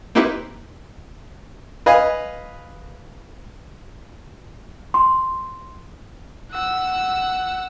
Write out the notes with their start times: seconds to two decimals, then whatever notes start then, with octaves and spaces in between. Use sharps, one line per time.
0.15 A#3 C4 D#4 E4 G4 B4
1.86 B4 D#5 F5 G#5
4.94 C6
6.52 F#5 E6